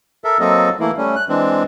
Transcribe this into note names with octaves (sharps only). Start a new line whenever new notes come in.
A4 A#4 E5
F#3 A#3 C4 A4 D#5
E3 A3 A#3 E4
G3 A3 C#4
F#6
E3 G#3 C4 D4